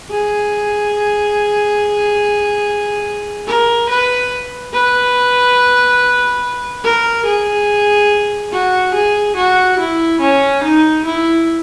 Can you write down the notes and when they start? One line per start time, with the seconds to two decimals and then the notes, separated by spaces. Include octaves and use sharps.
0.10 G#4
3.47 A#4
3.89 B4
4.73 B4
6.84 A#4
7.26 G#4
8.52 F#4
8.94 G#4
9.36 F#4
9.79 E4
10.21 C#4
10.63 D#4
11.05 E4